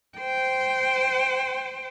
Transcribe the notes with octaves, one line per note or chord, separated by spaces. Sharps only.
C5 G5